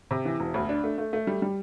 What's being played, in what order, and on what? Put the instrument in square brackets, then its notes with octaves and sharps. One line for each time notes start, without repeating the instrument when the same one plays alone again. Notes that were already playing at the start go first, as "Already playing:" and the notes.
[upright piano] C3
E3
E1
D2
D4
A3
A3
A3
G3
G3